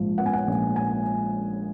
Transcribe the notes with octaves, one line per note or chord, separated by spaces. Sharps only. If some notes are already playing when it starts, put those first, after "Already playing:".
Already playing: A#1 G#2 F3
B3 F#5
G#5
F#5
A#1
G#5